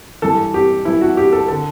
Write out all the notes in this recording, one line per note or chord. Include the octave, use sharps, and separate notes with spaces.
G2 E3 A4
G4
G2 E3 E4
F#4
G4
A4
D3 A4